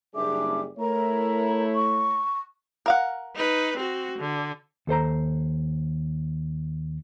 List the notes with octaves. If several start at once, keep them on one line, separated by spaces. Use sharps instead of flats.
F#1 G3 D4 G#4 E5 D6
A3 E4 A#4 C#5 A#5
C#6
A#4 F5 F#5
D#4 B4
C4 F#4
D3
D#2 A4 C5 A#5